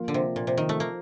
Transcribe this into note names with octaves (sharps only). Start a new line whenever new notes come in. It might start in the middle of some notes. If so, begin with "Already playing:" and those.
Already playing: F3 A#3 F4
D3
C3
A#2
C3
D#3
A3
A#3